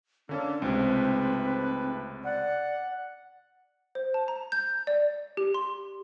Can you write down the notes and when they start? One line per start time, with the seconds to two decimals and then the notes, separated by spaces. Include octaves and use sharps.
0.29 D3 A#3 C#4 D4 A4
0.62 C#2 G#2 C3 A3 C4 B4
2.24 D5 F#5
3.95 C5
4.14 A5
4.28 A#5
4.52 G6
4.87 D5
5.37 G4
5.54 C6